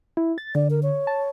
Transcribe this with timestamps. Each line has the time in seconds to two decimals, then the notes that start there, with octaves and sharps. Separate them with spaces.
0.17 E4
0.38 A6
0.55 D3 D5
0.70 A#4
0.83 C#5
1.07 A5